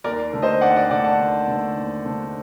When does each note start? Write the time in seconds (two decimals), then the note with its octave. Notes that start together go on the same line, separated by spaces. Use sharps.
0.04 D#2 A#4 D5
0.33 D3 A3
0.42 C5 D#5
0.61 D#2 D5 F#5
0.76 D5 F#5
0.90 D3 A3 D5 F#5
1.04 F#5 A5
1.19 D#2
1.48 D3 A3
1.76 D#2
2.05 D3 A3